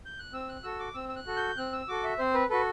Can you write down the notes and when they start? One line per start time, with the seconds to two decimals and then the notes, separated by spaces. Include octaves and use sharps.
0.06 G6
0.19 F#6
0.33 C4 E6
0.49 F#6
0.63 F#4 A4 E6
0.79 D6
0.94 C4 E6
1.09 E6
1.16 F#6
1.27 F#4 A4
1.37 G6
1.57 C4 F#6
1.72 E6
1.88 F#4 A4 D6
2.04 E5
2.19 C4 C5
2.34 B4
2.50 F#4 A4 B4